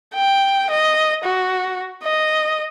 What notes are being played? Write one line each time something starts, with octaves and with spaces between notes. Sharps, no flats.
G5
D#5
F#4
D#5